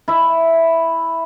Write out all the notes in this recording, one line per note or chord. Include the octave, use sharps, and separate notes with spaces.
E4 E5